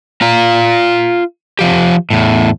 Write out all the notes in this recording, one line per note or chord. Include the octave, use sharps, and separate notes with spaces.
F4 A#5
F3 G4
E2 A2